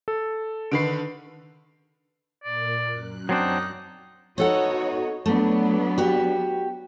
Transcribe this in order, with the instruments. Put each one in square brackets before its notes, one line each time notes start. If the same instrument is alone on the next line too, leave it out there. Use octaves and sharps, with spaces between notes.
[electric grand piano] A4
[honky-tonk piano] D3 D#3 B4 [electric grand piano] C7 D7
[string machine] A#2 A#4 [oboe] D5
[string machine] F#2 F#6
[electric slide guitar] F#3 C4 D4 [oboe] D#4
[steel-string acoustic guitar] B3 A4 F#5 [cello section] D#4 F#4 C#5
[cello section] F#3 B3 D4 [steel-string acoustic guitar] A3
[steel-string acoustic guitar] F#4 G4